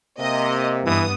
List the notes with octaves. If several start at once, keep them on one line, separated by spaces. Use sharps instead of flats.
C3 A#3 D#5
G2 E3 B3 D#6